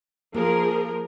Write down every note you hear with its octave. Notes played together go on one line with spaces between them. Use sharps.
F3 A#3 G#4 A#4